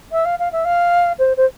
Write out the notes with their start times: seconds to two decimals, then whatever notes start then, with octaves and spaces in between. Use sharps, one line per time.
0.12 E5
0.25 F5
0.39 F5
0.52 E5
0.65 F5
1.19 C5
1.37 C5